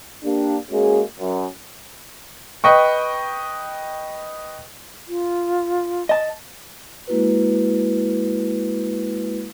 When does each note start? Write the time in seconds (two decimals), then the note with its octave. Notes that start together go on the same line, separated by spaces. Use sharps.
0.24 A#3 D4 G4
0.71 G#3 A#3 C#4 F#4 G#4
1.20 F#2
2.64 B4 D#5 G5 C#6
5.08 F4
6.09 D#5 A5
7.07 G#3 A#3 E4 F#4 B4